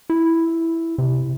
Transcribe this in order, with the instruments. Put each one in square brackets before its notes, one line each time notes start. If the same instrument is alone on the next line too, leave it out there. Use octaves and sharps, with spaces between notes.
[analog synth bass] E4
C3